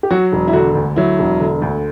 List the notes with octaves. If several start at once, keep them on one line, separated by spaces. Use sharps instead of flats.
G4
F#3 F#4
E1
E4
D3 F#4
D2
F#3 E4
E1
D3
D2